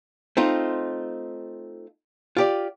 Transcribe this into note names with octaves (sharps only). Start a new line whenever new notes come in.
A3 C4 D#4 F4
F4 G4 D5